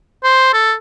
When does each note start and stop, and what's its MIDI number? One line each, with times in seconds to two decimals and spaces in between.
0.24 0.51 72
0.53 0.74 69